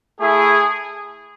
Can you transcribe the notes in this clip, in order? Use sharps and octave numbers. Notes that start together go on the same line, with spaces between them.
A3 E4 G#4